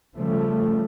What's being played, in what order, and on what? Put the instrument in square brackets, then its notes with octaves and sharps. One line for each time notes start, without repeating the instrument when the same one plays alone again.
[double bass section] C#3 F3 G3 A3